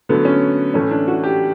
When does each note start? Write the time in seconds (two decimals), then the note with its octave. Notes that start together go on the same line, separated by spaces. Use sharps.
0.09 D3 F#3 A3 B3
0.25 C#4
0.74 A2 E3 A3 C#4
0.91 D4
1.08 F#4
1.23 G4